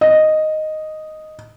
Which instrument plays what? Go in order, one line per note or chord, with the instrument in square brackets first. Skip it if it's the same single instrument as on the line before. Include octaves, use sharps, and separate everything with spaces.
[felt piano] D#5